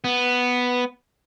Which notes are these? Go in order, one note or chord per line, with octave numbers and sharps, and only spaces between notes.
B3